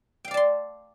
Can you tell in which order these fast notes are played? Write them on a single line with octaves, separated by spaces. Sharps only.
G5 F5 D5 A5 C6